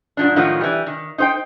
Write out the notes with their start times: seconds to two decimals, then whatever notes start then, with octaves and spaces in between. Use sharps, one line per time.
0.17 G#2 F3 D4
0.36 A2 D#3 F3 F#3 B3
0.61 E3 G3
0.86 D#3
1.18 D#4 C5 G5